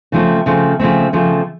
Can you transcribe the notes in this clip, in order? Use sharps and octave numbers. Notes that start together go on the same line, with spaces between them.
C#3 F3 A3 C4
C#3 F3 A3 C4
C#3 F3 A3 C4
C#3 F3 A3 C4